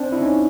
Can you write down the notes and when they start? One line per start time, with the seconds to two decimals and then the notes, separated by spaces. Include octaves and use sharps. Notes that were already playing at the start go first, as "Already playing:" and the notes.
Already playing: C4 D4
0.12 E4
0.21 C#4 D#4